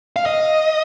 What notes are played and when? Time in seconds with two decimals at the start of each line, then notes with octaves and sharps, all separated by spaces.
0.16 F5
0.26 D#5